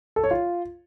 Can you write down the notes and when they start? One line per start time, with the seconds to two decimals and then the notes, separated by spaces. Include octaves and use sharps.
0.16 A4
0.24 C#5
0.31 F4